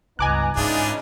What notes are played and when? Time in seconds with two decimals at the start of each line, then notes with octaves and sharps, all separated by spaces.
0.19 C#2 G2 B3 D#4 G#5 A#5 D6 F#6
0.57 G#2 C#3 E3 D4 D#4 F4 G#4